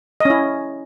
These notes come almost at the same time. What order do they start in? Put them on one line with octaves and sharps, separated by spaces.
D#5 C#4 E4